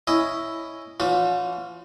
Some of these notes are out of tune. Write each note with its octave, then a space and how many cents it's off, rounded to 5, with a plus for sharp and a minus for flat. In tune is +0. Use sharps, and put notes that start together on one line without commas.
C#4 +0 E4 +0 D#5 +0
F3 -40 C#4 +35 F4 +45